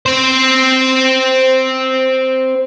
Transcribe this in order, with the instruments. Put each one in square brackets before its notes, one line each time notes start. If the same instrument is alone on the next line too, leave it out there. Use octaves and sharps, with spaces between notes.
[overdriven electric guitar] C4 C5